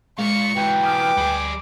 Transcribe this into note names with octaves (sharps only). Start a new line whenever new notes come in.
G#3 A#3 F4 C#6 C#7
E3 F#3 B4 G5
G#5 D6 D#6 F6
D2 G3 G#4